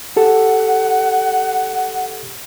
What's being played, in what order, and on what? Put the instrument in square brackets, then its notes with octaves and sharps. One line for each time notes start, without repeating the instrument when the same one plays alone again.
[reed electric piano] G4 A4 [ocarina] F#5